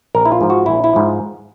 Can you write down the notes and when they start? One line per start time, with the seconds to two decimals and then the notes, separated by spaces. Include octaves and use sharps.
0.15 A#1 A#4
0.26 E4
0.32 F4
0.41 G#2 F3
0.50 F#4
0.66 A#1 E4
0.84 E4
0.93 G#2 F3